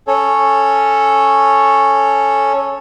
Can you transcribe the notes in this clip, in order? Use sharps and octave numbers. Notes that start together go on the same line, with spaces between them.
C#4 A4 C#5